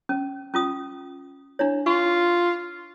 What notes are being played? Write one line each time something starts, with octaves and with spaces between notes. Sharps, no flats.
C#4
C#4 F4 D#6
D4 E4 C#5
F4 C#6